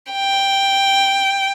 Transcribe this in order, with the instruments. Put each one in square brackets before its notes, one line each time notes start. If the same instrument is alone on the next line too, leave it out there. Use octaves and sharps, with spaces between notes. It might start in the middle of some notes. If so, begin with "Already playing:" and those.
[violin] G5